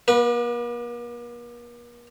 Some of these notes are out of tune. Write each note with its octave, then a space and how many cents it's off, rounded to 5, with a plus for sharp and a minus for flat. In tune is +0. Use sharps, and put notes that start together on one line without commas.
A#3 +45 B4 -20